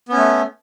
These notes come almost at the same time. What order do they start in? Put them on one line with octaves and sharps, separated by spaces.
B3 C#4 A3